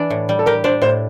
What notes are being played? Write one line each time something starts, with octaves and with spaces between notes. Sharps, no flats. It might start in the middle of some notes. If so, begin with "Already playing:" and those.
Already playing: E3 D4
A2
G3
A4
G4 A#4
D4 C5
A2 C5